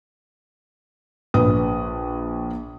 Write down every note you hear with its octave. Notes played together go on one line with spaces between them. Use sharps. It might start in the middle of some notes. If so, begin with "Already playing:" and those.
A#1 B4 D#6